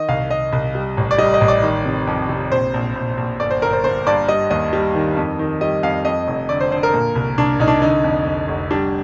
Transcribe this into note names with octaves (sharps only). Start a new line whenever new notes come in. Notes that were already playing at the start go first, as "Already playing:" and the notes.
Already playing: D#3 D#5
C2 F5
C2 D#5
C2
G3
A1
D5
G3 D#5
D#5
A1
D5
D#3
C3
F2
C3
A#1 C5
A#1
A#1
A#1
G1 D5
C5
G1 A#4
C5
G1 C5
G2 D5
G3 D#5
D#2 D#5
G3
D#3
F2
D#3
G3 D#5
F2 F5
F2 D#5
F1
D3 D5
C5
D3 C5
A#4
A#2
C2
C2 D4
C2 D#4
D4
D3 D#4
F2
F2
F1
G3 D4